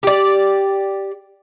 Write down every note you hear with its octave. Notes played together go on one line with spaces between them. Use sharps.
G4 D5